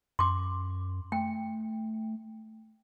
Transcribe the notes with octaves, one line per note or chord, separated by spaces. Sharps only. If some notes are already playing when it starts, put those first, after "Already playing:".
F#2 C6 D6
A3 G5